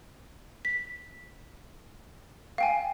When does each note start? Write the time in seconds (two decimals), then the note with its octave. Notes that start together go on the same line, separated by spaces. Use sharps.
0.65 B6
2.58 F5 G5 G#5